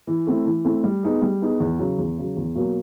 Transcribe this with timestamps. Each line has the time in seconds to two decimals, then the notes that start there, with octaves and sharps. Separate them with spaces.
0.07 E3
0.27 A3 C4 E4
0.46 E3
0.65 A3 C4 E4
0.84 G3
1.03 B3 D#4 G#4
1.22 G3
1.42 B3 D#4 G#4
1.60 E2
1.79 C#3 F#3
1.98 E2
2.18 C#3 F#3
2.36 E2
2.55 B2 F#3 A#3